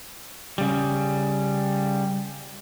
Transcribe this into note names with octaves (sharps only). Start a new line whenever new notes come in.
C#3 G3